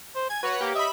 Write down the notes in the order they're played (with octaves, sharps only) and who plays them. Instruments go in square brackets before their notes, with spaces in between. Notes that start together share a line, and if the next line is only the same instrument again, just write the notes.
[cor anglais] C5
[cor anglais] G#5 [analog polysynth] G#6
[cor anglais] F#4 [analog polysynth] B4 C#5 F#5
[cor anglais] A#3 [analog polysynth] G4
[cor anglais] D#5 [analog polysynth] E5 B5